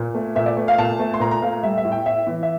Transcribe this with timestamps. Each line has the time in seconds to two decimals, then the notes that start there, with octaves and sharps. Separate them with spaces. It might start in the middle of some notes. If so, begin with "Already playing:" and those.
Already playing: A#2
0.15 A3
0.36 A#2 E5
0.46 D5
0.57 A3
0.68 F5
0.78 A#2 A5
0.99 A3
1.14 C6
1.20 A#2 A#5
1.31 A#5
1.42 A3 F5
1.63 G3 E5
1.78 E5
1.85 A2
1.92 G5
2.05 A2 E5
2.27 E3
2.43 E5